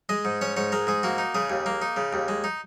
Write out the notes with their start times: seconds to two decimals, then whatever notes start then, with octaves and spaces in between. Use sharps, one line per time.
0.09 G#3 D#5
0.25 G#2
0.41 C#4 C#5
0.57 G#2 C#5
0.72 G#3 A#4
0.87 G#2 G#4
1.03 A#3 F#4
1.18 D#4
1.35 C#3 G#4
1.50 D#2
1.66 A#3
1.82 D#4
1.97 C#3
2.13 D#2
2.28 G#3
2.44 D#4